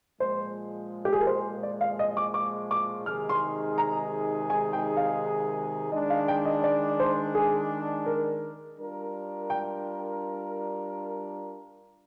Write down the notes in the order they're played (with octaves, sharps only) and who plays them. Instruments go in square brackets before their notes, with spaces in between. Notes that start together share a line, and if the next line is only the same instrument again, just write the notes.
[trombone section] A#2 F3 G#3 [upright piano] C5
[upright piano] G4
G#4
A#4
C5
D5
F5
D#5
D6
D6
D6
[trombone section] C3 D#3 G#3 D#4 G#4 [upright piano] F6
[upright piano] C6
A#5
G#5
G5
F5
[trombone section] D#3 G#3 D4 [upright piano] D#5
[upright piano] F5
G5
D#5
D5
C5
G#4
A#4
[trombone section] G3 D4 F4 A#4
[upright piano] G5